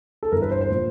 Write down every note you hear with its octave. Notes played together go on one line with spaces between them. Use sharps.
A4
G1 G2 E3 A#4
B4
C5
C5
A#2 F3